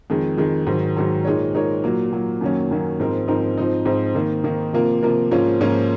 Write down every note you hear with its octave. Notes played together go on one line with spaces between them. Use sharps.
F2 D#3 G#3
F2 D#3 G#3
G#2 D#3 F#3
G#2 D#3 F#3
A#2 G#3 D#4 A#4 C#5
A#2 G#3 D#4 A#4 C#5
A#2 F#3 A#3
A#2 F#3 A#3
F#2 D#3 F#3 A#3 C#4
F#2 D#3 F#3 A#3 C#4
G#2 F3 C4 D#4 A#4
G#2 F3 C4 D#4 A#4
G#2 F3 C4 D#4
G#2 F3 C4 D#4
D#3 A#3 D#4
D#3 A#3 D#4
C3 F3 A#3 F4 A#4
C3 F3 A#3 F4 A#4
G#2 F3 A#3 C#4 F4
G#2 F3 A#3 C#4 F4